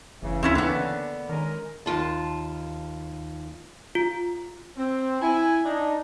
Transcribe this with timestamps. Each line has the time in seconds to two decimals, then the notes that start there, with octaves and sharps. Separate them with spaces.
0.23 F#1 C#3 E3
0.43 D2 C4 C#4 E4
0.55 D3 A#3 B3
1.29 D#3 G#3 C#4 A#4
1.86 D#2 F4 A5
3.95 F4
4.77 C4
5.22 E4 G#5
5.66 D4 D#4